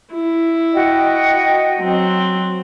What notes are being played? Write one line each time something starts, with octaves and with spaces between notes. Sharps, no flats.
E4
F#4 D#5 G5
F#3 C4